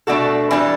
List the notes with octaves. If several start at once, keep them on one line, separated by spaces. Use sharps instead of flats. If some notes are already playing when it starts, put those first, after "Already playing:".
B2 A3 D4 F#4 A4
E3 G3 D4 A4